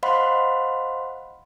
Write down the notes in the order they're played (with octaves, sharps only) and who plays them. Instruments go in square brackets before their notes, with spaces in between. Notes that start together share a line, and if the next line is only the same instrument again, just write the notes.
[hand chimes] C5 D#5 F5 F#5 B5 C6